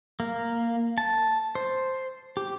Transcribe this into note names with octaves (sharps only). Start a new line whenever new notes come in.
A#3
A5
C5
G4